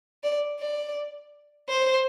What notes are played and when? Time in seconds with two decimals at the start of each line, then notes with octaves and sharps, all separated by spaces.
0.24 D5
0.60 D5
1.69 C5